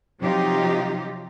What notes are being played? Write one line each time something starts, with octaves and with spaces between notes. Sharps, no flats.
C3 F3 F#3 D#4 F4 G4